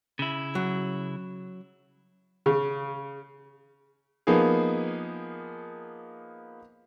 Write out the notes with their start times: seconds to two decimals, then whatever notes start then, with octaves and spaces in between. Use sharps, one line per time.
0.19 C#3 E4
0.55 F#3
2.46 C#3
4.27 F3 A#3 B3 D#4 G#4